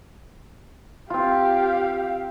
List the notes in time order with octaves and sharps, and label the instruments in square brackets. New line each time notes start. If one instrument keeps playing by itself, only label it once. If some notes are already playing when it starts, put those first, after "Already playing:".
[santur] C4 F4 [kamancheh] G4 F5